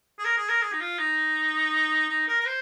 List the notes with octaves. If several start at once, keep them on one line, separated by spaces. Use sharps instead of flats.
G#4
A#4
G#4
A#4
G#4
D#4
F4
D#4
D#4
A#4
A#4
C5